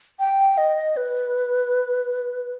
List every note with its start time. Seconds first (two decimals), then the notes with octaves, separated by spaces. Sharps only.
0.19 G5
0.58 D#5
0.97 B4